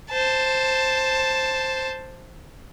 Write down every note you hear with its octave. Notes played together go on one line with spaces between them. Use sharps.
C5 A5